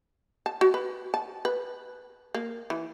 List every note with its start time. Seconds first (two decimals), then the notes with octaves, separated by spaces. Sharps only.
0.46 A5
0.61 F#4
0.74 B4
1.14 A5
1.45 B4
2.34 A#3
2.70 E3